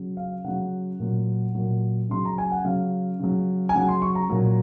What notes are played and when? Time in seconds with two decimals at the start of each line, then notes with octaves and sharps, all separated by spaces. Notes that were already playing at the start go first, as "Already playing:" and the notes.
Already playing: C#3 F#3
0.17 F5
0.44 C#3 F#3 F#5
1.00 A#2 F#3
1.55 A#2 F#3
2.09 C#3 F#3 C6
2.25 A#5
2.38 G#5
2.52 F#5
2.65 C#3 F#3 F5
3.20 C#3 F#3
3.69 G#5
3.75 C#3 F#3 F#5
3.89 C6
4.02 C#6
4.15 A#5
4.30 A#2 F#3